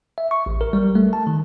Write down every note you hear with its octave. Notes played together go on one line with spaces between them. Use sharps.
E5
C#6
A1
A#4
G3
A3
A5
D#3